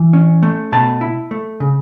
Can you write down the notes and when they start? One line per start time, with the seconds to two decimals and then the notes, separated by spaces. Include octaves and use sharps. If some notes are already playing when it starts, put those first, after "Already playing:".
Already playing: E3
0.13 C#4
0.43 A3
0.72 B2 A5
1.01 E4
1.31 A3
1.60 C#3